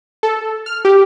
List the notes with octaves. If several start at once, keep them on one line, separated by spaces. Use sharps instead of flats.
A4
F6
G4